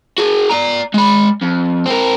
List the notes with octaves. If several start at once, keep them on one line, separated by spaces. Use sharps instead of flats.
F#4 G#4
D5 A#5
G#3 B5
F2
C4 A#4